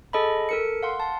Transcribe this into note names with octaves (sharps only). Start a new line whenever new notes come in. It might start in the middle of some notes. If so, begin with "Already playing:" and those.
G#4 A4 D#5 A5 B5
A4 A#4 C#7
F5 F#5 C6
A5